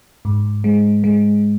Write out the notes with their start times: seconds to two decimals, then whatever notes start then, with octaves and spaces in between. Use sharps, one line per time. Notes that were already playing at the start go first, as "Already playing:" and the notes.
0.25 G#2
0.64 G#3
1.04 G#3